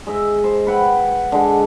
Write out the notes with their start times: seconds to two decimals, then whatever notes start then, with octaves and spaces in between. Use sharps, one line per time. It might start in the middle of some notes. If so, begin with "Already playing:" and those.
0.07 G#3 D#5 E5
0.44 C5
0.67 B4 F#5 G5
1.32 D3 G#3